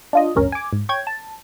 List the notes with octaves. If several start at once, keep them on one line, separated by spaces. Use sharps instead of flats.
D4 F4 D#5
A1 D2 G2 C#4 A#4
G#5 D6
G#2
C#5 G5 G#6
A5